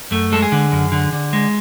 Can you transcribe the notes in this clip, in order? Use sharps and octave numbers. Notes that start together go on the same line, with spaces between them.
F#2 A3
G#3 A4
G#4
D3
F#2
D3
D3
G#3